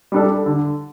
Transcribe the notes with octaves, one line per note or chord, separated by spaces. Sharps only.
G3 D4 A4
D3